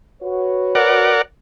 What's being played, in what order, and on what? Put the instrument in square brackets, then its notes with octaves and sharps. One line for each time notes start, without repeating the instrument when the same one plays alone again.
[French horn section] F#4 B4 C#5
[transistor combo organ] A#4 D5 F#5